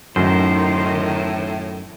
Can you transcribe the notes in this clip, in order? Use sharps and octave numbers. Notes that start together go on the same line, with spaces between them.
F#2 A2 D#3 C5